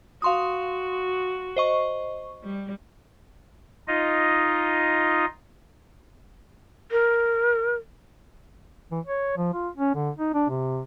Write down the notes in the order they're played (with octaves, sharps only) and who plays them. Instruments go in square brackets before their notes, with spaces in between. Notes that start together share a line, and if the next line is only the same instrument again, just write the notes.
[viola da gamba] F#4 [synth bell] F5 C6 D#6
[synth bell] C5 D#5 C#6
[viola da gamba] G3
[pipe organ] D#4 F4 D#5
[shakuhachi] A#4
[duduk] E3
C#5
F3
F4
C#4
D3
D#4
D4
C3